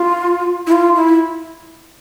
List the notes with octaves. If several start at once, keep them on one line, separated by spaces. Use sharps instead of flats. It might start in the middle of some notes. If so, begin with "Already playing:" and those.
Already playing: F4
E4
F4
E4